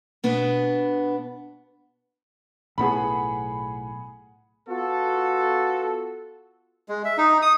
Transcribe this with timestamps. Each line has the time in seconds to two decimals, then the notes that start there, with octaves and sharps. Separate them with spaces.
0.24 B2 B3 D4 B4
2.78 B1 A2 B3 G#4 F#5 B5
4.69 B3 F4 F#4 A4
6.89 G#3
7.05 E5
7.18 D#4
7.42 D#6